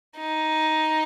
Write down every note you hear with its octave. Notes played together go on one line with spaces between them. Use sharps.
D#4